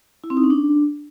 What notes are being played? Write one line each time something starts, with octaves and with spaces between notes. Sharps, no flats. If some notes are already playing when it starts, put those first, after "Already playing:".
E4
C4
D#4
C#4
D4